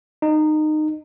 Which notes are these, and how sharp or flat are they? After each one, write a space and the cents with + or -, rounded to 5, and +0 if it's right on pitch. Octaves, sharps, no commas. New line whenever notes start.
D#4 -20